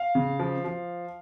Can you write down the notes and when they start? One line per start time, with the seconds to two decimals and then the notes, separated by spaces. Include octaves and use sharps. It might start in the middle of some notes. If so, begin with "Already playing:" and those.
Already playing: F5
0.15 C#3
0.39 F3
0.64 F3